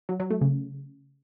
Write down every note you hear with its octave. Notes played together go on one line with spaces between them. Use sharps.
F#3
F#3
A3
C#3